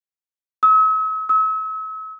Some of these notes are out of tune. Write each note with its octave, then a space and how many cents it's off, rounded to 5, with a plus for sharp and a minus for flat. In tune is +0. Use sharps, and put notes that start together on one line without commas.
E6 -45
E6 -40